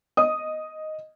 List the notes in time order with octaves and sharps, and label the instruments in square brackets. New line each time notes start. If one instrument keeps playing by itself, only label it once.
[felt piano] D#5 D#6